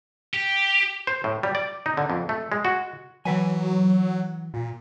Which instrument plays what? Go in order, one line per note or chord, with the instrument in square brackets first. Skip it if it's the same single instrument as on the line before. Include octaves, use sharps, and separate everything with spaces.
[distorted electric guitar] G4
[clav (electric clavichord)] C5
A2
G3
D5
D#4
D3
F2
A3
G#3
F#4
[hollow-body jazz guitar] E3 B4 G#5 [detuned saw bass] F#3
[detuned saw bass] A#2